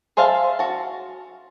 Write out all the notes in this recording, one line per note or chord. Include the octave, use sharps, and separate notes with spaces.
G#4 C5 E5 F5 A5
F#4 A5